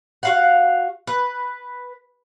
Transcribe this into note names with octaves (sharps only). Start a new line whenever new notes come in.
F#4 F5 F#5
B4